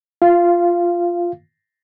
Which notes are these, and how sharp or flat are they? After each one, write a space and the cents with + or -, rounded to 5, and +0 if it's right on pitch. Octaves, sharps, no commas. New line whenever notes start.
F4 +0 F5 -20